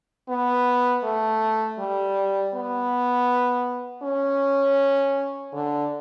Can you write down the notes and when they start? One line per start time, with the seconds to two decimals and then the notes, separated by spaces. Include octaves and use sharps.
0.29 B3
1.04 A3
1.79 G3
2.54 B3
4.02 C#4
5.53 D3